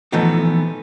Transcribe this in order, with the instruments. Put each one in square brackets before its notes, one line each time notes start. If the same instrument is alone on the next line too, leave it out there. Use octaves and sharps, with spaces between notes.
[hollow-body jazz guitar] E3 F3 A3 B3 D#4